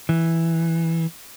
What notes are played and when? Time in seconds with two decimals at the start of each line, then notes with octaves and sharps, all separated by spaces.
0.09 E3